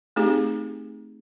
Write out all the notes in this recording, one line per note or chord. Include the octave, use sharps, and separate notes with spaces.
A3 C4 D#4 G4 G#4